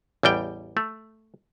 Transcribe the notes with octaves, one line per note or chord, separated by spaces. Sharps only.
A1 E2 G3 G5
A3